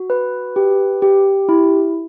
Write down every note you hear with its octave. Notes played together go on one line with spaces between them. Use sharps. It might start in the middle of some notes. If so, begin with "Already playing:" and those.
Already playing: F#4
B4
G4
G4
E4